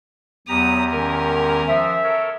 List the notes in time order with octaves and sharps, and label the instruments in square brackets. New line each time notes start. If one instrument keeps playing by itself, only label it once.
[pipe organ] E2 G4 A#5 [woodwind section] F#3 B3 [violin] D#6
[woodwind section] D#3 G#3 [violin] C#4 A#4
[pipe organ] F3 [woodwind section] E5
[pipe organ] A4 A#4 C#5